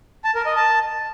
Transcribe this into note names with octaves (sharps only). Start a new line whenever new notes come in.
A5
A#4
D#5
A5